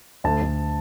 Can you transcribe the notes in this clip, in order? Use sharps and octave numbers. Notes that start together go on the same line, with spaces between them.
D2 A5
D2